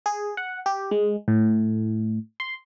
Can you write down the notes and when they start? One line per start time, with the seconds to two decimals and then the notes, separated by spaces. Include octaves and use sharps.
0.06 G#4
0.37 F#5
0.66 G4
0.91 G#3
1.28 A2
2.40 C6